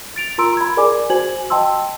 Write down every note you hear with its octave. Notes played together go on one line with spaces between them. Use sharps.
A6 D7 F7
F4 A#4 A#5 C6 E6 D7
B5 G#6
G#4 A#4 D5 G#5 D6
F#4 C5 G#5 G#6 F#7
D#5 G5 A5 C6 E6